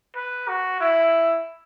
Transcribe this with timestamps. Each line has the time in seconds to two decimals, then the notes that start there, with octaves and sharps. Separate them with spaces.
0.16 B4
0.48 F#4
0.81 E4